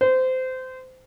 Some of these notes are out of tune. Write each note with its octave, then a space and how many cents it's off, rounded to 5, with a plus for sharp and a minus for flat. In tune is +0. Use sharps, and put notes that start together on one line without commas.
C5 -20